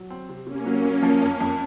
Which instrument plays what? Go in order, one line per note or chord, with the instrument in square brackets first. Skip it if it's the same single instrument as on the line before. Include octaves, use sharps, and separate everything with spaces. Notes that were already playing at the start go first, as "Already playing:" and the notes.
Already playing: [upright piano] F#3
C4
C3
[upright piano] C3 [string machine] A#3 C#4
[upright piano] F#3
F#3
F3
F2
F2